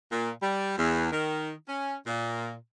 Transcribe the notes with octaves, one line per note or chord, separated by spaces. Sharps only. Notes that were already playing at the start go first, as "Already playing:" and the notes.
A#2
G3
E2
D#3
C#4
A#2